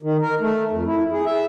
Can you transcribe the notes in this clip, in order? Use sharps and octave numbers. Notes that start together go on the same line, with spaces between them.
D#3
A#4
A3
F2
E4
G#4
E5